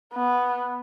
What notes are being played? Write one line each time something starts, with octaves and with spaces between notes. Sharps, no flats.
B3